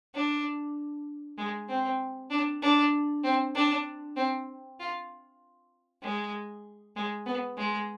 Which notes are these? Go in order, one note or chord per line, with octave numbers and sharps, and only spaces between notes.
D4
G#3
C4
D4
D4
C4
D4
C4
F4
G#3
G#3
B3
G#3